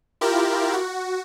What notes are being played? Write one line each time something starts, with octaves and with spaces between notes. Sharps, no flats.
E4 F4 G4 A#4
F#4